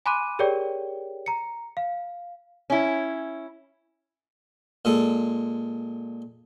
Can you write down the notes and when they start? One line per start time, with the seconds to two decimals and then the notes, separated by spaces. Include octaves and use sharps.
0.06 G#5 B5 C6 D6 F#6 D#7
0.39 G4 G#4 A#4 C#5 D5 G5
1.26 A#5 C#7
1.77 F5
2.70 C#4 E4
4.85 A#2 G#3 A4